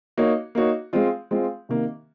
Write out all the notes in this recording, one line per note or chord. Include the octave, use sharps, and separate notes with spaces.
A#3 D#4 F#4 C#5
A#3 D#4 F#4 C#5
G#3 C4 F4
G#3 C4 F4
C3 D#3 A#3